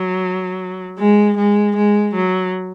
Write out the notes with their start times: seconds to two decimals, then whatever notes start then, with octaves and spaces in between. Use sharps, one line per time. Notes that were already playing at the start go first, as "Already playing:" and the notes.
Already playing: F#3
0.99 G#3
1.37 G#3
1.76 G#3
2.14 F#3